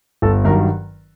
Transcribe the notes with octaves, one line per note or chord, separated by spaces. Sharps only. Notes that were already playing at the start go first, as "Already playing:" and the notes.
G1 A4
G2 D#3 F#3 A#4